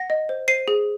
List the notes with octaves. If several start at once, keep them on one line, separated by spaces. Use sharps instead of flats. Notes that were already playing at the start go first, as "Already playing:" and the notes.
Already playing: F#5 A#6
D#5
C5
C5 C7 D#7
G#4